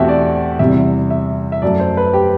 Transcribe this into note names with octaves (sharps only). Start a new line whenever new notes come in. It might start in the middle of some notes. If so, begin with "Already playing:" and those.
Already playing: E2 B2 A3 C4 F#4 G4 E5
D5
E2 C3 G3 E5
E5
E5
F#2 F#3 A3 D5
C5
B4
G4